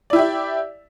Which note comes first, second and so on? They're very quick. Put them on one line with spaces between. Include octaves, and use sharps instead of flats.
D5 E4 G4 E5